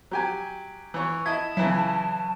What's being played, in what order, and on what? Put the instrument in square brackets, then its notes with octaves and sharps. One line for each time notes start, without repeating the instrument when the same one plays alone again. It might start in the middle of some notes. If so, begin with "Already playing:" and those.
[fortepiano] F#3 G4 G#5
E3 C#5
[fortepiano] E4 D#5 [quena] A5 [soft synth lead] G#6
[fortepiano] C#3 E3 E4 [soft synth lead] F#3